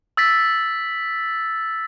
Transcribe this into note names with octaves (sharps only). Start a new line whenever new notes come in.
E6 A6 B6